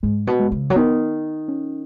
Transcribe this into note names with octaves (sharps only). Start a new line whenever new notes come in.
G#2 G#3
B2
G#3
C#3
F#3
D#3 B3
C#4